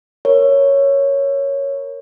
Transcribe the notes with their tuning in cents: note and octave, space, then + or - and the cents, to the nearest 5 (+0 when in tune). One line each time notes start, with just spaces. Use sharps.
A#4 +0 C#5 +0